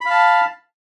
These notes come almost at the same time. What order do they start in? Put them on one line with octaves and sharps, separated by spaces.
B5 F5 A5